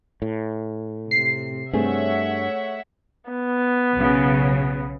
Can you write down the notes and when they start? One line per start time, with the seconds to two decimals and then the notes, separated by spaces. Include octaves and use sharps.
0.22 A2
1.11 C3 C7
1.73 G2 A3 C4 G#4 C#5 E5 F#5
3.30 B3
3.95 B1 C#3